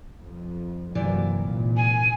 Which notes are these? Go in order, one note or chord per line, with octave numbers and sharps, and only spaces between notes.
F2
G2 C3 E3 F#3 A#3 D5
G#1 A#2
G#5